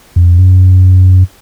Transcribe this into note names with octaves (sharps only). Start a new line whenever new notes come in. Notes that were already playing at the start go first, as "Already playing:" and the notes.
F2
F#2